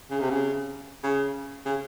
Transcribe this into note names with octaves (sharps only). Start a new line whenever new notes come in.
C#3
C3
C#3
C#3
C#3